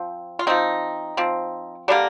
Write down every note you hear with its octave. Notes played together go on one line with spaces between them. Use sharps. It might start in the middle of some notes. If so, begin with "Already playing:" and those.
Already playing: F3 C4
F4
F3 C4 D#4
F3 C4
D3 G3 A#3 D4